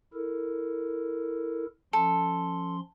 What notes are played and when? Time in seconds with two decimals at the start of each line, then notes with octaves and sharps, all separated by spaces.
0.14 E4 A4 A#4
1.93 F3 C#4 A4 C6